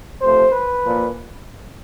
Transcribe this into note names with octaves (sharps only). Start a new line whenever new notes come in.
C3 F3 A3 C5
B4
A#2 F3 A#3